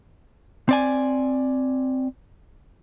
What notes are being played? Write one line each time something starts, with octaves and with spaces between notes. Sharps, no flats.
C4 D5 G#5